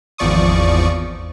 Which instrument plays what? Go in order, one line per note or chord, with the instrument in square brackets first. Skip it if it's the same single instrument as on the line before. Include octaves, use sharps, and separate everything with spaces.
[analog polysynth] G#1 E2 F3 D5 C#6 D#6